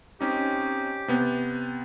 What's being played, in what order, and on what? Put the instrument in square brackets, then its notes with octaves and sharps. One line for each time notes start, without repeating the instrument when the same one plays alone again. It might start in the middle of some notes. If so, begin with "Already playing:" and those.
[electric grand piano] C4 C#4 D#4 [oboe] G4
[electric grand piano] C3 B3 G6